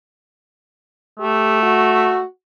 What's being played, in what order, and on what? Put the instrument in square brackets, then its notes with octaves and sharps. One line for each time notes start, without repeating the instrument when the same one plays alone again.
[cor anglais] A3 [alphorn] G4
[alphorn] F#4